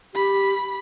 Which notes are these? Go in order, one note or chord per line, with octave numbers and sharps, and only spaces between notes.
G4 B5